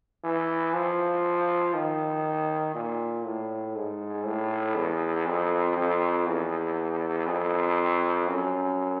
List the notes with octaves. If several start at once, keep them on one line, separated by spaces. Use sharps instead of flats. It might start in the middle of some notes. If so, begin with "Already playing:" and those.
E3
F3
D#3
A#2
A2
G#2
A2
E2
F2
F2
E2
F2
F#2